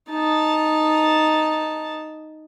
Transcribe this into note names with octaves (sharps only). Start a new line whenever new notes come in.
D#4 A5